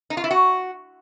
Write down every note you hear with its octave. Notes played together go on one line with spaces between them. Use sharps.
D#4
F4
E4
F#4